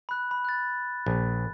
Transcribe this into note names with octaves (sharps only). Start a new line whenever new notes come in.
B5 F#6
B5
F#6 A6
A#1